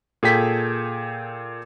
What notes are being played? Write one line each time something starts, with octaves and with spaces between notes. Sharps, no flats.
A#2 G#4 A4 G5 B6